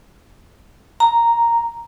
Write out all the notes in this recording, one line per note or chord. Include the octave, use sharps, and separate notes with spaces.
A#5